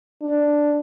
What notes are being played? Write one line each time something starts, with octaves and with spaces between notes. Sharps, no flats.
D4